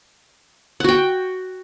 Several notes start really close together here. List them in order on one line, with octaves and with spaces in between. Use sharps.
F#5 F#4 G5